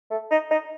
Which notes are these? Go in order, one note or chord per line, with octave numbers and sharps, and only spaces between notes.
A3
D#4
D#4